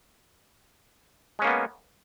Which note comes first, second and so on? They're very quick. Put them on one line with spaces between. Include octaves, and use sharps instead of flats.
G#3 C#4 A#3 B3